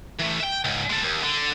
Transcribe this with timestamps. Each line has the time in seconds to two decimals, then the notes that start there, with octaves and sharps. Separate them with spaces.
0.20 E3 A3
0.41 E5 G5
0.65 C#2 G#2
0.90 G#3 A4
1.03 D#2
1.23 D3